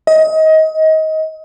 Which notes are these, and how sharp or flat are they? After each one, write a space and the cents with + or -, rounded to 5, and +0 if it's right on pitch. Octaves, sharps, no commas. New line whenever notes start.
D#5 +25